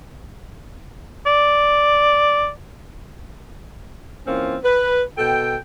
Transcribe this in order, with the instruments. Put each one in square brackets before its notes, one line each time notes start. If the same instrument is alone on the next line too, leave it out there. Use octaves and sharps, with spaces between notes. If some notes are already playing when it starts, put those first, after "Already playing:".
[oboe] D5
[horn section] E3 A#3 C4 C#4 F4
B4
B2 A4 G5